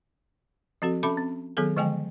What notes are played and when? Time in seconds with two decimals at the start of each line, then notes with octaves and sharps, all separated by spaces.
0.82 F3 C4 F#4 A4
1.03 C#4 A4 E5 A5 B5 D6
1.17 C4
1.57 D#3 F#3 B3 G#4 A4
1.77 D3 F3 G#3 D#5 G5 G#5